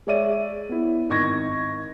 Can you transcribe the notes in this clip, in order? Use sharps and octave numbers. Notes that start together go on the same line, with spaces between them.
G#3 C#5 D5 E5 D#7
B3 E4
G#1 D#4 C#6 G#6 A#6